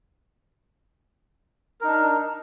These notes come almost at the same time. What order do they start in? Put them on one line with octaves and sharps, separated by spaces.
A#4 D#4 D4